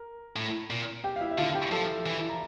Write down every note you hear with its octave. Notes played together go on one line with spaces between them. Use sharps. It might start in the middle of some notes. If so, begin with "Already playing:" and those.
Already playing: A#4
A2
A#2
G4 G5
F5
E4 E5
E5
D3 F4 F5
F5
G4 G5
F3 A4 A5
E3
A#5